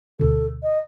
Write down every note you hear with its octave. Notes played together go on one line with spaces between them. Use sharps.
D2 B2 D3 A4
D#5